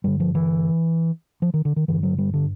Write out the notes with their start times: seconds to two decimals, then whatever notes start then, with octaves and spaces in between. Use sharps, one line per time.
0.04 G2 D3 G3
0.20 F3
0.35 E3
1.42 F3
1.54 D#3
1.65 D3
1.76 D#3
1.88 G2 D3 E3
2.03 F#3
2.18 G3
2.34 D3